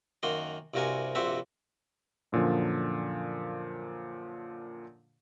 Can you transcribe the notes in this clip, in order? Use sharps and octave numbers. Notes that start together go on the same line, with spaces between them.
F#2 D#3 A#3 F#4 C6
C2 G2 C3 F#4 A#4 G#5
A#1 G2 C3 C4 F#4 E5
F#2 A#2 D3 F3